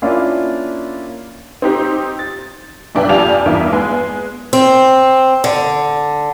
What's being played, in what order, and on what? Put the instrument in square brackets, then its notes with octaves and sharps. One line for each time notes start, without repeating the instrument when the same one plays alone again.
[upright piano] A#3 C#4 D4 E4 F4
[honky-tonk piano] C4 D#4 G4
A6
B1 G2 D4 B4 E5 G5
F2 G4 D5 F5 G#5 F7
E2 G2 A#3 D#4 E5
G#3 B3
[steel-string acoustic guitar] C4
D3